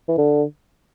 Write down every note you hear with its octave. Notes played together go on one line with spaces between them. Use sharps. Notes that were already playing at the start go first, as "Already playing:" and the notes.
E3
D3